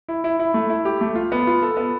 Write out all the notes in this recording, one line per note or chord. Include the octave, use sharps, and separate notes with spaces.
E4
E4
E4
A3
E4
G4
A3
F4
B3
F4
A4
B3